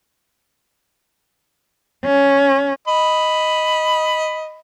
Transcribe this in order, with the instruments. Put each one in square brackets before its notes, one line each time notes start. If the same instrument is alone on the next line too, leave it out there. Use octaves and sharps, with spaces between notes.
[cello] C#4
[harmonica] D#5 B5